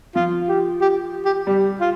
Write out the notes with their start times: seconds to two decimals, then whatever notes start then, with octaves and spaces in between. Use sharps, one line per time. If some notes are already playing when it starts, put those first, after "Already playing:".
0.15 F3 F4
0.49 G4
0.81 G4
1.25 G4
1.47 G3 G4
1.80 F4